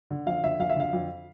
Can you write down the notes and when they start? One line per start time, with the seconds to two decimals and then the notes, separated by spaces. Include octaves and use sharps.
0.11 D3
0.26 F2 F5
0.43 D3 E5
0.59 F2 F5
0.70 E5
0.76 D3 F5
0.93 F2